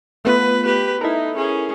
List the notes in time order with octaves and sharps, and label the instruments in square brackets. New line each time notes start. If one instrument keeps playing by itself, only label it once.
[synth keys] A3 B3 F4 [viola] B4
[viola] G4 B4
[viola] D#4 [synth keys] E4 A4 A#4
[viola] C#4 G#4